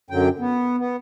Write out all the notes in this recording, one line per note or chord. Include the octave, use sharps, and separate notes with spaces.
F#2 D3 F#3 G5
B3
B3